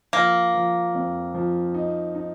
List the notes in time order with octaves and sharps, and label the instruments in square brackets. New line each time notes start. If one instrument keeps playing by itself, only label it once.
[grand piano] F3 [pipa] A#3
[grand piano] F3
F2
F3
D#4
D#4